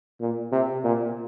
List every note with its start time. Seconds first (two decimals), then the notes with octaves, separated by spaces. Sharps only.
0.20 A#2
0.52 C3
0.84 A#2